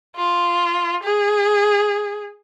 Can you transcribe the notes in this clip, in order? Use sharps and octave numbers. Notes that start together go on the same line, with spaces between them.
F4
G#4